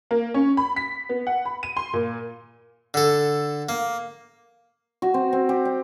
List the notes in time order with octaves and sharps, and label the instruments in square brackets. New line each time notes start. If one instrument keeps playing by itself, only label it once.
[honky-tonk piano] A#3
C#4
B5
B6
B3
F#5
B5
D#7
C6
A#2
[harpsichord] D3 A4
A#3
[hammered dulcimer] F#4
C4
C4
G4
G5